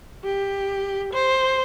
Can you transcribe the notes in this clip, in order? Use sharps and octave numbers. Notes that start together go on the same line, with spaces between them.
G4
C5